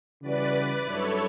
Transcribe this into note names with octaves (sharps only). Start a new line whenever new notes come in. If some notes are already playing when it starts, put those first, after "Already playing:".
C#3 E3 G3 C#4 F#4 B4 D5
G2 F#3 C#4 E4 A4 B4 C#5